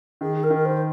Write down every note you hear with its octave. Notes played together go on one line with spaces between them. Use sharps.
D#3 G#4
G#4
A#4
D#3
A#4
C5